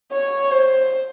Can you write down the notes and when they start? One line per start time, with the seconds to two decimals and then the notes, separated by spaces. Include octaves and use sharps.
0.11 C#5
0.51 C5